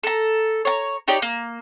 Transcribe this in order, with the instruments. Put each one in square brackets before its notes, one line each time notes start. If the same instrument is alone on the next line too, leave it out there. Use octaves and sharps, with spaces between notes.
[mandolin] A4 A#5
C#5 A#5
D#4 G4 C#5 D5
A#3